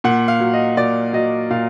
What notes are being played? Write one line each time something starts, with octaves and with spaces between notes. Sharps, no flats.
A#2 F#5
F5
F#3
D#5
A#2 D5
F#3 D#5
A#2 F5